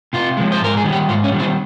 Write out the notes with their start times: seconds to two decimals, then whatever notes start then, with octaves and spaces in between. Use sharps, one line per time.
0.13 C3 F4
0.37 F3 G#3
0.52 C5
0.60 G#2 A#4
0.77 G#4
0.84 D#3 G3
0.92 G4
1.08 G#2 F4
1.24 C#4
1.32 D#3 G3
1.39 C4